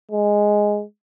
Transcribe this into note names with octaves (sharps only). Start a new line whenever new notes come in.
G#3